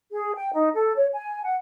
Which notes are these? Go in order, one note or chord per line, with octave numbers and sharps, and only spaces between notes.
G#4
G5
D#4
A4
C#5
G#5
F#5